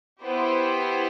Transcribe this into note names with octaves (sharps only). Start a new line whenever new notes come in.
B3 E4 G4 C5